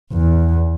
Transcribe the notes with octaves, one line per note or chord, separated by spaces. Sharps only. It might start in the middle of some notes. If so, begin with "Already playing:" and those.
E2